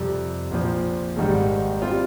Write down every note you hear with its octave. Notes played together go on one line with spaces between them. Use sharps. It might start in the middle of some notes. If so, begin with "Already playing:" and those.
Already playing: F2 C3 G3
A#1 A#2 F3
G#1 G#2 D#3 G3
G3 C4 F4